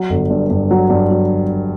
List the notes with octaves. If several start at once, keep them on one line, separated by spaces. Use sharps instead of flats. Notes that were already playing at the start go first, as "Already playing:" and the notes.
Already playing: F#3
G1
G2
G2
F#3
G2
F#3